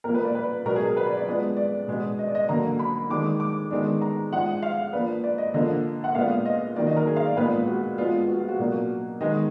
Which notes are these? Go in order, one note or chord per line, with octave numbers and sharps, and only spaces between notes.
A#2 F3 A#3 A#4
B4
D5
B4
B2 F#3 B3 D4 A#4
G#4
A#4
B4
D5
D5
F3 G#3 B3 D4
D5
B2 G#3 B3 D4
D#5
D5
D#5
D3 F#3 A#3 A#5
B5
D#3 G#3 D4 D6
D6
D#3 G#3 B3 D4
A#5
F3 G#3 D4 F#5
F5
F3 A#3 D4 B4
D5
D#5
D3 F3 A#3 D4 D#5
F#5
A#2 G#3 B3 D4 F5
D#5
D#3 F#3 A#3 D4 D5
D#5
A#4
G#4
F5
D5
A#2 F3 G#3 B3 D4 B4
F#4
F3 G#3 B3 D4 F4
F#4
F4
F#4
B2 F#3 A#3 D4
D#3 G#3 B3 D#5